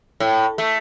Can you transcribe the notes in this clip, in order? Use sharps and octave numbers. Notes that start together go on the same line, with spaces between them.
A2
A3